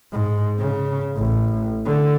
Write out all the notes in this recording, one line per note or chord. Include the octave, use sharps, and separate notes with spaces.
G#2
C#3
A1
D3